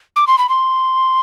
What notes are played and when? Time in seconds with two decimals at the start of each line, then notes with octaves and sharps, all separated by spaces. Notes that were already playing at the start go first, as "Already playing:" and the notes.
0.16 D6
0.27 C6
0.38 B5
0.49 C6